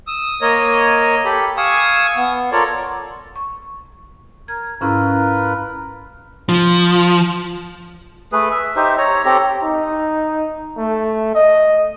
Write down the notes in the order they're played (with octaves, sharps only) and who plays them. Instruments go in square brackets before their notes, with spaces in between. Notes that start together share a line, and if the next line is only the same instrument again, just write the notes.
[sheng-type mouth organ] D#6 E6
A#3 A#4 C#5 D#5
G4 A4 B5
F5 G#5 C#6 D#6 E6
B3
F4 A4 A#4 C#5 D5
[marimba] C#6
[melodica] A#4 [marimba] G#6
[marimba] G#2 C#4 E4 [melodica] F4 A#4 B4
[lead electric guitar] F3
[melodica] A3 G#4 B4
E5
D#4 G4 C5 E5
C#5 A#5
C4 G4 A4 A#5
[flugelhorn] D#4
A3
D#5